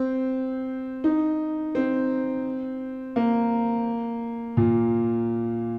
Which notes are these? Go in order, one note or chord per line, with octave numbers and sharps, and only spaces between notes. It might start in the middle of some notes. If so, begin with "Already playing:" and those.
Already playing: C4
D#4
C4
A#3
A#2